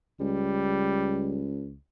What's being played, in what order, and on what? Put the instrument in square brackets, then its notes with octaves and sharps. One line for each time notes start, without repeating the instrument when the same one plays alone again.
[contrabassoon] C#2 [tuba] G3